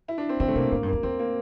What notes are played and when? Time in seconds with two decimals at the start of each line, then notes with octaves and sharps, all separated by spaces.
0.08 E4
0.18 D4
0.29 C4
0.40 D3 C4
0.48 A3
0.55 C3 A#3
0.72 A2 A#3
0.83 G2
0.87 A#3
0.93 E2
1.03 E2 C4
1.19 A#3